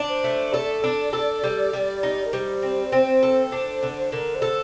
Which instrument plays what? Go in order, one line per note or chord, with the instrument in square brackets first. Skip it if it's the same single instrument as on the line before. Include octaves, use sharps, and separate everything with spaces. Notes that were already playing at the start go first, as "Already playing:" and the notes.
Already playing: [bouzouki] D4
[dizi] C5
[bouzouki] A3
[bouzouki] A4 [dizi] D5
[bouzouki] D4
A4
G3
G3
D#4
[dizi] A#4
[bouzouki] G3 [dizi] C5
[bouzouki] C4
C4
A4
D4
D3
[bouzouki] D3 [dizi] A#4
[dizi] C5
[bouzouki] A4